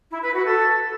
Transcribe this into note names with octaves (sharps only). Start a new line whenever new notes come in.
E4
B4
F#4
A4